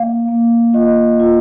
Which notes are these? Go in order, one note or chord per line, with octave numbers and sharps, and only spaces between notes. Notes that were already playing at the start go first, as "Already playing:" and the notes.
Already playing: A#3 F5
A#3
F4 D#5
F4